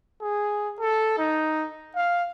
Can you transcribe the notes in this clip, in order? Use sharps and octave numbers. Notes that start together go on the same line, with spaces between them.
G#4
A4
D#4
F5